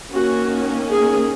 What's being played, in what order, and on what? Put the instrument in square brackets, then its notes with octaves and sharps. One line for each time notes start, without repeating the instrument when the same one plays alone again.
[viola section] D#3 A#3 C#4 F#4
G#4